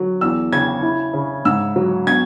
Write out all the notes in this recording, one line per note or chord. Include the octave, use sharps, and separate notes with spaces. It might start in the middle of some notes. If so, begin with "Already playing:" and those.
Already playing: F#3
E2 E6
C#3 G#6
E4
C#3
G#2 E6
F#3
B2 G#6